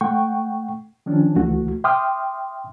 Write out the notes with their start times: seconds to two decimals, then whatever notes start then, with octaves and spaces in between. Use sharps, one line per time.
0.01 A3 F#5 G5 C#6
1.06 D#3 F3 C#4 D4
1.36 C#2 E3 A3 F#4
1.84 E5 G5 C6 D6 D#6 F6